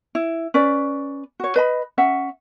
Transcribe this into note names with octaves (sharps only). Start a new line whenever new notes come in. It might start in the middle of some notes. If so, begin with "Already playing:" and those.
E4
C#4 B4 D5
F#4 C#5
B4 D#5 B5
C#4 E5 F#5